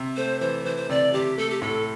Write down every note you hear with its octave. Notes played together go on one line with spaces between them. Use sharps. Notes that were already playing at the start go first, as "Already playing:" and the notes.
Already playing: C3
A3 C5
E3 C5
E3 C5
C5
C3 D5
C3 G4
A3 A4
G4
A2 A4